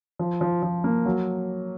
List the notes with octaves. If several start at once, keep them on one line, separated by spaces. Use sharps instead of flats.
F3
F3
F3
A#3
F#3